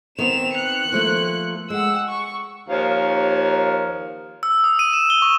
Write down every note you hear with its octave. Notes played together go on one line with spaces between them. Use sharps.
D#3 B3 C4 E7 F7
F#6 C#7
F3 A3 A#3
G#3 F#5 E6
C#6
D#2 F3 A#4 C#5 F5
E6
D#6
D#7
E7
G7
C#6